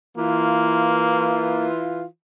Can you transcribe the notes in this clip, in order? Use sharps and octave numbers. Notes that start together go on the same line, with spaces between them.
E3 A#3 F4